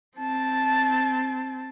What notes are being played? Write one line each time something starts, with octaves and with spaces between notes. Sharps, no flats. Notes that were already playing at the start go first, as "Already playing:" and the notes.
C4 A5